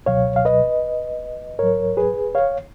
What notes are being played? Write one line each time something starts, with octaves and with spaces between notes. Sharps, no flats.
C#2 B2 F#3 C#5 F5
F5
B4 D#5
G#2 F#3 A#4 C#5
G#4 B4
C#5 F5